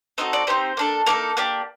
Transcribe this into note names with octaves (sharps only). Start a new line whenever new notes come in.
C4 D#4 F#4 A4 D#5
D5
C4 D#4 G4 C5
A#3 D4 A4
A#3 D#4 A4 A#4
A#3 D4 G4